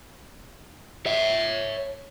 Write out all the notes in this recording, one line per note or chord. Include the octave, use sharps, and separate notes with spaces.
C#5 E5